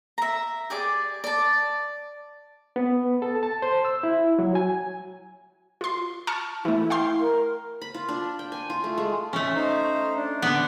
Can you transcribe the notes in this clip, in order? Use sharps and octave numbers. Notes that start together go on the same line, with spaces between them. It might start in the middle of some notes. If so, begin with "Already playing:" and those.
E5 A#5
G4 G#4 D5 D6
D5 A5
B3
A4
A5
C5
E6
E4
F#3
G#5
F4 C6
A5 C#6 F6
E3 A3 E4
F5 G5 C6
A#4
B5
F4
D4
G5
G#5
F4
A3
G#3
A3 C#4
D#4 C5
D4
D3 B3